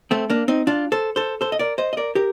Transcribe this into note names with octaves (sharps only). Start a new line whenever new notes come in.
A3 C4
A#3 D4
C4 D#4
D4 F4
A4 C5
A4 C5
A4 C5
D#5
A#4 D5
C5 D#5
D#5
A#4 D5
G4 A#4